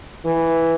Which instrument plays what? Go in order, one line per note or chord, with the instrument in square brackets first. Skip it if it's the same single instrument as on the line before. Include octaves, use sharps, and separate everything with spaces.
[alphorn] E3